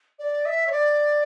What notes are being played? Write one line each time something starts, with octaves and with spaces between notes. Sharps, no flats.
D5
E5
C#5
D5